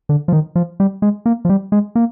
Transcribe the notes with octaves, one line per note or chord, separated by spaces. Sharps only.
D3
F3
D#3
F3
G3
G#3
A#3
F3
G3
G#3
A#3